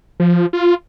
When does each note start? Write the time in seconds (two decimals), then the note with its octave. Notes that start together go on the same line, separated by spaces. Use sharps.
0.20 F3
0.53 F4